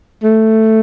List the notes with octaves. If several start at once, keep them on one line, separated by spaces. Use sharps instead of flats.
A3